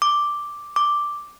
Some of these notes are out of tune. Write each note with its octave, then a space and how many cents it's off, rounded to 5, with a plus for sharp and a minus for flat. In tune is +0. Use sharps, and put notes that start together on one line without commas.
D6 +0
D6 +0